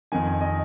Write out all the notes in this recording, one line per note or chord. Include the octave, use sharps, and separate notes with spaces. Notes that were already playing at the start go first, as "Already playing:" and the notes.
F2 D#3 G#5
D#5